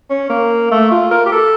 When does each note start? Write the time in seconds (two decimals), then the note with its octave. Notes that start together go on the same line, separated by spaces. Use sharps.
0.10 C#4
0.29 A#3
0.71 A3
0.91 F4
1.11 A#4
1.26 G4
1.32 A4